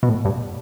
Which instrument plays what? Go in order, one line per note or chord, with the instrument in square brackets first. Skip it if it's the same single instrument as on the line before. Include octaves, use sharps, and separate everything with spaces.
[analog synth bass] B2
A2
G2